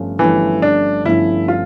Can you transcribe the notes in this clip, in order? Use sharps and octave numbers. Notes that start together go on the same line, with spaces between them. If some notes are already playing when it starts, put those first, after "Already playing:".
Already playing: G1 G2 F3 A3 C#4
G1 G2 E3 F3 A3 C#4
D4
G1 G2 F3 A3 C#4 E4
F4